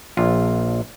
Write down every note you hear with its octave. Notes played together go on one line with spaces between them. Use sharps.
A#1 F4